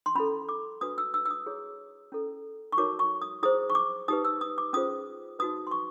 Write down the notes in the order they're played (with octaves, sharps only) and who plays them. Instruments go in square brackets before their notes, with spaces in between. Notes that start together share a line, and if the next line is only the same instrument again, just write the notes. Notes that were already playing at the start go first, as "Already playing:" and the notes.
[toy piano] C6
C#4 E4 A4 B5
D6
D4 F#4 B4 D#6
E6
E6
E6
D#6
E4 G#4 C#5
C#4 E4 A4
C#6
D#4 F#4 A#4 C#5 D6
C#6
D#6
E4 G#4 C5 D#6
C#6
D6
D#4 G4 B4 D#6
E6
D#6
D6
C#4 F4 G#4 C5 D#6
D#4 F#4 B4 D#6
C6
C#6